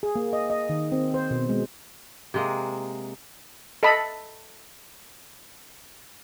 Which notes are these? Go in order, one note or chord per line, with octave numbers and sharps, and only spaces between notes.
G#4
A#3
D#5
D#5
D#3
C4
C5
B2
G#3
C3 G#3 A#3
A4 D#5 A5 B5